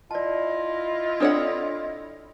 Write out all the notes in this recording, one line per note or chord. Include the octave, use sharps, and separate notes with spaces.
E4 F4 D5 D#5 A5
C4 D4 A4 C#5 D5 F#5